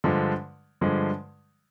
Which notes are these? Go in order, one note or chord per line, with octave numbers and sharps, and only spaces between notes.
G2 D3 F3 G#3
G2 D3 F3 G#3